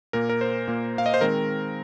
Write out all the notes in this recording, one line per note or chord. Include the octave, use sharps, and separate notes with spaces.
A#2 A#3 A#4
A#4
C5
A#2 A#3
F5
D#5
C5
D#3 G#3 C4 A#4